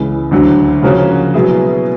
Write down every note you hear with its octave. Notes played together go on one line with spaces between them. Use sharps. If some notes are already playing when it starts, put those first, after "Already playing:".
Already playing: C#2 C#3 E3
D2 D3 F#3
C#3 F3 A#3 C#4 F#4
B2 F#3 B3 E4 G#4